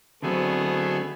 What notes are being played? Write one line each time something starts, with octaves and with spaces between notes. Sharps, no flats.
D3 F#3 A3 B3 C4 G#4